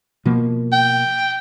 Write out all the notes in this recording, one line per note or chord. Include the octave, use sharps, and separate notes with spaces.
B2 F3 A#3
G5